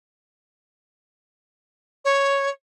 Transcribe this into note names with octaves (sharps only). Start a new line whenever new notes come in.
C#5